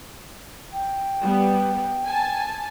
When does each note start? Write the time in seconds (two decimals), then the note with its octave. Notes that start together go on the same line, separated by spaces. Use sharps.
0.73 G5
1.22 G3 B3
2.05 G#5 A5